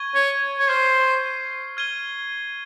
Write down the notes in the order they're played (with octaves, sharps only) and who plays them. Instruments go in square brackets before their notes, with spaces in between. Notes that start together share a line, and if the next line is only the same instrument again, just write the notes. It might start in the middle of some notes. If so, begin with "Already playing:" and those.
Already playing: [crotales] C#6 G#6 D#7 G7
[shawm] C#5
C#5
[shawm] C5 [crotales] C#6 F6 C7
[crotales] F6 G#6 D#7 G7